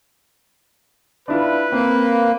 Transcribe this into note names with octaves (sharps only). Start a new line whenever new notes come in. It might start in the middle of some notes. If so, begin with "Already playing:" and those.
D4 E4 F4 B4
A#3 C4